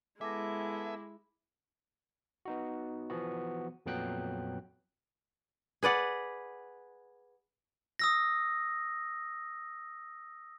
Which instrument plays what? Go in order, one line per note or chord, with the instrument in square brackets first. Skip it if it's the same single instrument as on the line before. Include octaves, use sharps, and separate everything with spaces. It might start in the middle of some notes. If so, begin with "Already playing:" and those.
[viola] G#3 E4 [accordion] B3 A4 G#5 [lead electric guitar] E5 [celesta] D6 A#6
[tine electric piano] B3 D#4 F#4
E3 F3 B3 F#4
F2 A#2 F#3 B3 G5 F#6
[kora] G#4 B4 D5 F#5
[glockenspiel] D#6 E6 A#6